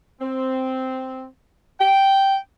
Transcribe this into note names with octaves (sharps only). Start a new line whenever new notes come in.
C4
G5